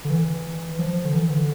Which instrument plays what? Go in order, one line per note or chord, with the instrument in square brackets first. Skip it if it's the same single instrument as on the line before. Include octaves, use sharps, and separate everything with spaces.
[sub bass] D3
E3
F3
D3
E3
D3